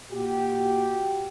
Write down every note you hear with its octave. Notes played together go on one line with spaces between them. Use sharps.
A#2 F#4 G4